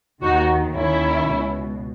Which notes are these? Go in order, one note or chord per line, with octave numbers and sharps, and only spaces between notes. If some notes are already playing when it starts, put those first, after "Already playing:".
D#2 D#3 D#4 F#4
D#2 D#3 C#4 E4
C#2 B2